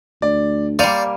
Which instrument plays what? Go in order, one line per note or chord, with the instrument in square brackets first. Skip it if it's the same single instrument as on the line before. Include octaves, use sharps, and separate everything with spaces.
[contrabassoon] D2 [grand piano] D5
[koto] G3 A#3 [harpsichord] C5 D5 [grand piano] C#7 D#7 F7